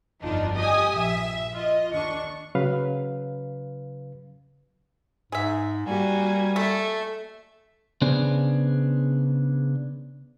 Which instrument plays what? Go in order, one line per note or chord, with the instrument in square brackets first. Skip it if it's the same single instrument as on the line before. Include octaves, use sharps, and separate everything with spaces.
[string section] G1 F2 D4 D#4 F4
G4 D#5 G#5 D#6
A#1 E5
F4 D#5
D#2 D4 C#6
[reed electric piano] C#3 F#3 B4 F5
[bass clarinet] G#2 [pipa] G#4 E5
[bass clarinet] G3 [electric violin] A#3 G#5 [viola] F#4 G4
[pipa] A3 [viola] A4 E5
[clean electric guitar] C#3 B3 D4 G#4 C5